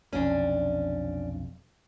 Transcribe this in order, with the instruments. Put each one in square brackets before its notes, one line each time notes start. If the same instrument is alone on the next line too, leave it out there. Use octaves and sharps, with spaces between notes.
[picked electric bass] F1 B1 F2 [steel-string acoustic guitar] C#4 D4